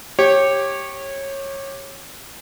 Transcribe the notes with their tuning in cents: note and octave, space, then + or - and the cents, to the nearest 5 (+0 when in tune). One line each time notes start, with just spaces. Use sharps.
G4 +0 C#5 -20